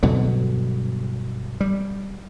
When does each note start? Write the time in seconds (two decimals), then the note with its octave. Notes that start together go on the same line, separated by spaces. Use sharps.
0.03 G2 B2 D3 F#3
1.61 G3